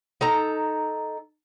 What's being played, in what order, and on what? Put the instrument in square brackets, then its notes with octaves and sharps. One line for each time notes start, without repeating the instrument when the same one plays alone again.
[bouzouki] D#4 A4 A#5